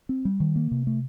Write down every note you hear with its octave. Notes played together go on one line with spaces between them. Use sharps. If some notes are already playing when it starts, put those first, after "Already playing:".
C4
G3
D#3
A#3
C3
A3